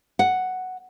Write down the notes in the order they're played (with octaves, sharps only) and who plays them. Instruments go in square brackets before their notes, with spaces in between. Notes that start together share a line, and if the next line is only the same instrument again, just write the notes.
[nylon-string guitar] F#5